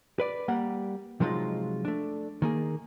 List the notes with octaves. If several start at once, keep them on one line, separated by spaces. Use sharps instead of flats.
B4 D5
G3 A#3 F#5
C3 F3 F#3 G#3 D#4 F4
A3 D4
D#3 A#3 G#4